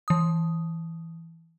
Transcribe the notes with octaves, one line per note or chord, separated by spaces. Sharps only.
E3 D#6